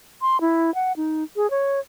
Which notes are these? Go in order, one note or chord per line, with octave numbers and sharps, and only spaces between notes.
C6
E4
F#5
D#4
G#4
C#5